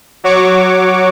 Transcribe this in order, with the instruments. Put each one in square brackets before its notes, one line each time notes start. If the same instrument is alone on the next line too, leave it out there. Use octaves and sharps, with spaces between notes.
[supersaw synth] F#3 F#4 C#5 C#6 D6